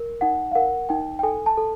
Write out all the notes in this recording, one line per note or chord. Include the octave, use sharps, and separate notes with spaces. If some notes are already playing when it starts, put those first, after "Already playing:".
Already playing: A#4
D#4 F#5
F5
A#4 F#5
D#4 G5
G5
A4 G#5
A5
A4